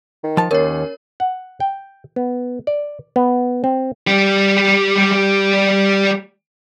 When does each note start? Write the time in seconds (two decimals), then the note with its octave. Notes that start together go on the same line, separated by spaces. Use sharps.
0.23 D#3
0.37 F3 A5
0.51 D#2 C#4 A#4 C#5
1.20 F#5
1.60 G5
2.16 B3
2.67 D5
3.16 B3
3.64 C4
4.07 G3 G4